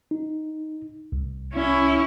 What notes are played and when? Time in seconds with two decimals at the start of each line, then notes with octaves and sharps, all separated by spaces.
0.11 D#4
1.12 C2
1.54 C#4 E4